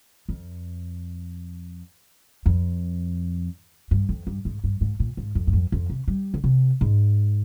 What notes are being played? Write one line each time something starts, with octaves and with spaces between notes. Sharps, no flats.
F2
F2
G2
F2
G2
G#2
G2
G#2
A#2
G#2
F2
G2
F2
F2
C3
G3
D3
C3
G#2